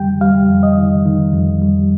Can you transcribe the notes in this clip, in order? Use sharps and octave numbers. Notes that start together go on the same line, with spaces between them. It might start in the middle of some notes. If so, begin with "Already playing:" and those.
Already playing: F2 D#3 G3 G5
G3 F5
F2
D#5
D#3
D#3
F2
G3